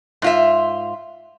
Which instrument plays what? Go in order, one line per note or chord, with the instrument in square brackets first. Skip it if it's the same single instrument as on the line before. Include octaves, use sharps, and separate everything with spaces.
[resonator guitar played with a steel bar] G#2 F4 E5